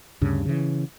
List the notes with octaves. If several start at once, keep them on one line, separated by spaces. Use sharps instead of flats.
D2 G2 C#3
C#3 E3